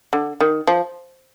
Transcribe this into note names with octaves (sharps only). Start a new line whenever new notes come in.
D3
D#3
F3